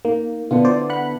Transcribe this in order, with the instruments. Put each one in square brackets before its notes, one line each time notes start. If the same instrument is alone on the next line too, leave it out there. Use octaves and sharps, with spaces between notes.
[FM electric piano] A#3 [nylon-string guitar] D#4
[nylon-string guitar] D3 B3 E4 [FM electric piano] F4
[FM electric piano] C5 D5
F#5 B5 F#6